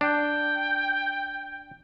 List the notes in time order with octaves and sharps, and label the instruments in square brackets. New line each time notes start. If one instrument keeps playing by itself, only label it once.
[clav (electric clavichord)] D4 [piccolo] G5